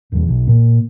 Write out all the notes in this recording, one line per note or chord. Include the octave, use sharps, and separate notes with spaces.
D#1 E2
B1
A#2